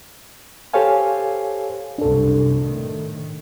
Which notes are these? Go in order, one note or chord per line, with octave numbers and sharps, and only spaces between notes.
G4 A4 C5 C#5 F5 G#5
C2 F#2 D4 A4
A2 D#3